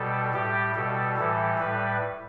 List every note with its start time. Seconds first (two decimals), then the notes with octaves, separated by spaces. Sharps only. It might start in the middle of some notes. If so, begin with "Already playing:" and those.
Already playing: B2 G3 A4
0.33 A2 G3 G4
0.75 B2 G3 A4
1.17 A2 E3 G3 A4
1.59 A2 G3 B4